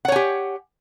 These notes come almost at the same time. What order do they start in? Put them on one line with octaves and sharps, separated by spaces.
F#5 C#5 G#5 G4